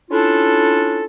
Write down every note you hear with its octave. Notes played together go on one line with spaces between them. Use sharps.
C#4 D4 E4 F4 A4